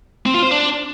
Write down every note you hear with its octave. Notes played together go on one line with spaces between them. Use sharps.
C4
F4
C5
D4